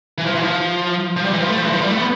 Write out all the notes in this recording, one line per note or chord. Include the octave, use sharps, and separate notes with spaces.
E3
F3
E3
F3
F3
G3
E3
F3
A3
F3
E3
F3
G3
A3
B3